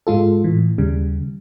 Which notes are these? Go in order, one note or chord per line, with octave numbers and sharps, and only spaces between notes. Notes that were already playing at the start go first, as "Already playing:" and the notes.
G#2 G#3 F4 A4
A2 E3
D#2 C#3 G3